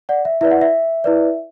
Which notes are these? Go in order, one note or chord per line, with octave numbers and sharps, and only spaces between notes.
D5 F#5
E5
E4 B4 D5 E5
F#5
E5
E4 B4 D5